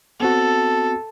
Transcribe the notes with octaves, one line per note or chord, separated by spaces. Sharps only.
B3 C4 F#4 A4